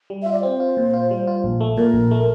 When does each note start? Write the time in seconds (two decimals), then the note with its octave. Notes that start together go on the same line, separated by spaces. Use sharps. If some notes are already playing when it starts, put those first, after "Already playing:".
0.10 G3
0.23 F4 E5
0.32 D5
0.43 C4 C5
0.60 F4
0.77 A#2
0.94 F4
1.11 G3
1.27 F4
1.44 A#1
1.61 A3
1.77 A#2 A#4
1.94 A#1
2.11 A3